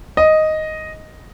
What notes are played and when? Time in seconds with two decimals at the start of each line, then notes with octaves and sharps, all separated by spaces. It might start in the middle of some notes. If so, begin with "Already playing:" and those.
0.17 D#5